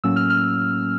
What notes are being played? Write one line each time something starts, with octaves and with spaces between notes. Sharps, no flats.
A2 F#3 A#3 C#4 E6
F6
F6